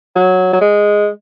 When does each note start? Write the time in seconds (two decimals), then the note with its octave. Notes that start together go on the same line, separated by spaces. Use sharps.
0.16 F#3
0.53 F#3
0.61 G#3